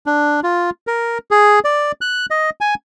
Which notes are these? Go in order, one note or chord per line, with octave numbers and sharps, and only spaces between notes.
D4
F4
A#4
G#4
D5
F#6
D#5
G#5